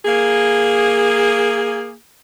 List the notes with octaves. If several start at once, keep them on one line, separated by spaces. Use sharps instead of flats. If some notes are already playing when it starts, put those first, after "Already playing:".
A#3 G#4